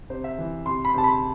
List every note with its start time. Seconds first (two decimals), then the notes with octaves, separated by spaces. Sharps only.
0.10 C3 C5
0.24 E5
0.39 E3
0.66 C3 C6
0.85 B5
0.94 C3 A5
1.04 B5